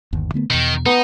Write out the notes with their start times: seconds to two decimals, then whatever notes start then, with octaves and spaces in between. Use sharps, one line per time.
0.13 G1 D#2
0.34 D3 A3 B3
0.50 E2 B2 D#3
0.86 B3 D#4